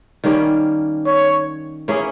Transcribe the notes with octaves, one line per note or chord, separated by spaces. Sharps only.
D#3 G3 A#3 C#4
C#5
E3 A#3 C#4 G#4